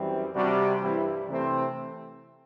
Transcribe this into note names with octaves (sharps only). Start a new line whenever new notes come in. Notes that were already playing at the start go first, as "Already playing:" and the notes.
Already playing: F#2 E3 G3 C4
C3 G3 C4 D4 F#4
G2 E3 G3 C4 E4
C3 E3 A3 C4